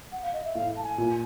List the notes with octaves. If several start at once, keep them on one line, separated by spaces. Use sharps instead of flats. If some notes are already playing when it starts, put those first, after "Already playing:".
F#5
F5
D#5
E5
A2 F5
A5
G#5
A#2